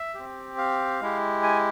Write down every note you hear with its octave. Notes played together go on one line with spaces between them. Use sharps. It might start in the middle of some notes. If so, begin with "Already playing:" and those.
Already playing: E5
C4 G4
F5
G#3 E4 G4
G#5